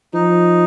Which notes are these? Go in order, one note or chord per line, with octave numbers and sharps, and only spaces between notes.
F3 D#4